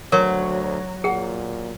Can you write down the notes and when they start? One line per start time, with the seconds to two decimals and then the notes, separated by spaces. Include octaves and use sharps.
0.12 D2 F#3 A#4 C#5 C6
1.04 A#2 G#4 F#5